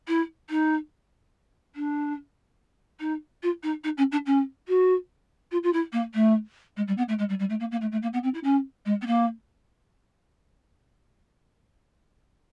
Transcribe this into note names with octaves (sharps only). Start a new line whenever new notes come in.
E4
D#4
D4
D#4
F4
D#4
D#4
C#4
D4
C#4
F#4
F4
F4
E4
A#3
A3
G#3
G3
B3
A3
G#3
G3
G3
A3
A#3
A#3
A3
A3
A#3
B3
C4
E4
C#4
G#3
B3
A#3